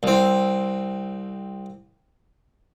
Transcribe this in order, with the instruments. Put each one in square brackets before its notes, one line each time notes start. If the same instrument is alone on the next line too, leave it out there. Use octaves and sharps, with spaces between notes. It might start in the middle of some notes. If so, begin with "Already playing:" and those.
[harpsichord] C2 C4